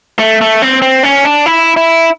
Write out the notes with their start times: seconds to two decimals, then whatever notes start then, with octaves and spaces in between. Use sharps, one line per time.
0.19 A3
0.41 A3
0.62 C4
0.82 C4
1.03 C#4
1.24 D4
1.46 E4
1.77 E4